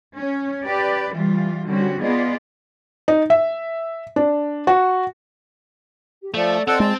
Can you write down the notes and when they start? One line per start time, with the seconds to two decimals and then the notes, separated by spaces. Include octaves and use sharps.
0.17 C#4
0.65 G4 B4 D5
1.14 E3 G3 F4
1.67 D3 G3 C4 C#4 F#4
2.01 B3 F4 G#4 D5 D#5
3.08 D#4
3.30 E5
4.16 D4
4.67 F#4
6.22 G4
6.34 F3 A3 D5
6.68 C4 F4 A4 D5 D#5 F#5
6.80 G#3 A5